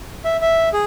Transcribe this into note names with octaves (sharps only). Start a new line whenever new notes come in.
E5
E5
G#4